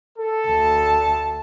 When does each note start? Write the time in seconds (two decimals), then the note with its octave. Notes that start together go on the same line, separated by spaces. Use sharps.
0.18 A4
0.48 D2 A5